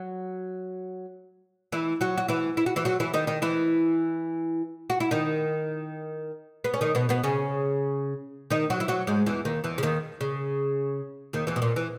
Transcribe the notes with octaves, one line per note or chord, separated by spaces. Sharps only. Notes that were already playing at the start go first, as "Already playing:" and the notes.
Already playing: F#3
E3 E4
F#3 F#4
F#4
E3 E4
E4
F#4
E3 E4
F#3 F#4
E3 E4
D#3 D#4
D#3 D#4
E3 E4
F#4
E4
D#3 D#4
B3
C#4
D#3 D#4
B2 B3
B2 B3
C#3 C#4
D#3 D#4
F#3 F#4
E4
F#3 F#4
G#2 G#3
E2 E3
D#2 D#3
E2 E3
C#3
D#2 D#3
C#3
D#2 D#3
E2 E3
B2
A#2
E3